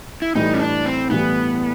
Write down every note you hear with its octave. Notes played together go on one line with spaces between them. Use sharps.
E4
A2 E3 G3 D#4
C#4
D4
C4
A2 E3 G3 B3